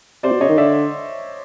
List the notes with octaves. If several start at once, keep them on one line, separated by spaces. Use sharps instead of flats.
C3 C5 D5
B2
C#3 C#5 D#5
D#3
D3 D5 E5